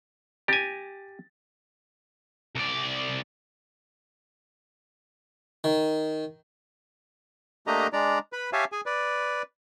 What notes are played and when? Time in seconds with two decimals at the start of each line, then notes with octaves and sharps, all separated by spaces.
0.48 G4 G#5 A6 A#6
2.55 C2 D5
5.64 D#3
7.67 A3 A#3 D4 G4 D#5 A#5
7.93 G#3 D4 D5 A#5
8.33 B4 B5
8.53 G4 C#5 E5 F5 G#5 A5
8.72 G#4 G#5
8.86 B4 D5